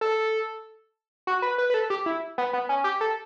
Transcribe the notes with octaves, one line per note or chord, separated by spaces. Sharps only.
A4
F#4
B4
B4
B4
A4
G4
E4
B3
B3
C#4
G4
A4